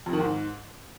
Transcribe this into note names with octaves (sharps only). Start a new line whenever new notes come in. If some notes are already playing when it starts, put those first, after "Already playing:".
F2
D#3
G#2